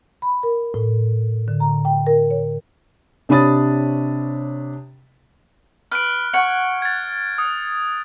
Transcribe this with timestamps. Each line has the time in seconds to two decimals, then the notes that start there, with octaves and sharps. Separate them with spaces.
0.22 B5
0.43 A#4
0.74 A2
1.48 D3
1.60 A#5
1.85 G5
2.07 A#4
2.31 C#5
3.29 C3 D4 C#5 B5 D#6 A6
5.92 B4 F6 F#6 D7
6.34 C#5 F#5
6.82 G#6 A6
7.38 D#6